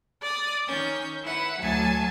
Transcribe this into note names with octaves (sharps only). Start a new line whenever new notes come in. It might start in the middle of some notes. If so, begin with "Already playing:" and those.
D5 D6 D#6
D#3 C#4 G6
E4 B4 F#5
D2 F#3 G#5 A5 G#6